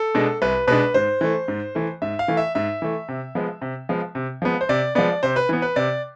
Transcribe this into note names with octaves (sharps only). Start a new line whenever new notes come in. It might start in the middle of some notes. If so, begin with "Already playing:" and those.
Already playing: A4
B2 G#3 D4
C2 B4
B2 G#3 D4 B4
G#2 C5
E3 A3
G#2
E3 A3
G#2 E5
F5
E3 A3
E5
G#2 E5
E3 A3
C3
F3 G#3 B3
C3
F3 G#3 B3
C3
F3 G#3 B3
C5
C3 D5
F3 G#3 B3 D5
C3 C5
B4
E3 B3
B4
C3 D5